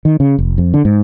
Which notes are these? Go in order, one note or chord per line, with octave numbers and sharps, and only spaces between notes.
D#3
C#3
F1
F2
D3
G#2